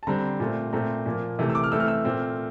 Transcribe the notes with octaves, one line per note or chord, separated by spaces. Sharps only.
A5
D3 G3 C4 A#5
A#2 A3 C4
A#2 A3 C4 A#5
A#2 F3 A#3
C3 E3 A3
E6
D6
F6
E3 A3 C4 E6
F6
E6
A#2 A3 C4